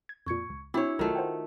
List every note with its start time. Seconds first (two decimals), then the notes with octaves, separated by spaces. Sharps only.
0.09 G#6
0.26 F2 A#2 C#6 G#6 C#7
0.50 C#2
0.74 C4 D4 E4 F#4 C#5 D6
0.99 B1 D#3 A3 F4 F#4
1.15 C5 F#5 G5